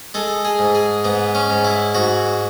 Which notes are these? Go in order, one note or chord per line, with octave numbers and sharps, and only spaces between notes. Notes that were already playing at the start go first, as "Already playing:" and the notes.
G#3 A4
G#4
G#2
G#4
G#2 B3
C#4
G#2
E4
G#2 F#4